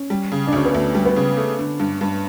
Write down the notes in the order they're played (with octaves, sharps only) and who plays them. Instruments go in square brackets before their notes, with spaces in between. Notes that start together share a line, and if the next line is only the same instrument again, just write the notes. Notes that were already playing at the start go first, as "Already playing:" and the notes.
Already playing: [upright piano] C#4
[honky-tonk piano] G3
C#3
[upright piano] D4
[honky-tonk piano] D2 [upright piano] C#4
[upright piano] B3
[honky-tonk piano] D2 [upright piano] A3
[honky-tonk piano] G3
[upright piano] B3
[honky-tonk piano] C#3
A3
D3
G2
G2